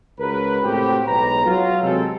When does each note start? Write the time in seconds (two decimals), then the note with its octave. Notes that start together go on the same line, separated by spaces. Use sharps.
0.19 C#2 F#4 A#4 B4
0.64 A2 C3 C4 F#4 G4
1.06 B1 G#3 B4 A#5
1.46 F#3 F4
1.82 C3 E3 G#3 C4 A4